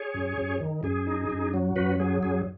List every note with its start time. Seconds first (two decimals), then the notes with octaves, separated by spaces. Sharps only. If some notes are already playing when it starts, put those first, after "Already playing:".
Already playing: G#4 C#5
0.14 F#2
0.37 F#2
0.60 D#3
0.83 F#2 G#4
1.07 D#4
1.30 F#2
1.54 F#3
1.76 F#2 F#4 B4
2.00 F#3 G#4
2.23 F#2 G#4